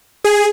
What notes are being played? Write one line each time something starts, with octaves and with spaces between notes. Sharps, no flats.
G#4